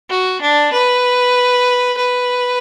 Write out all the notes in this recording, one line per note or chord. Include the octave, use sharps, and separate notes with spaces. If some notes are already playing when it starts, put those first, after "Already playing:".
F#4
D4
B4
B4